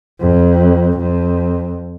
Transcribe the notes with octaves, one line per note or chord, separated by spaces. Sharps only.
F2
F2